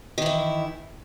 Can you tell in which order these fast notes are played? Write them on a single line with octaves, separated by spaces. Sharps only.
D#3 E3 E4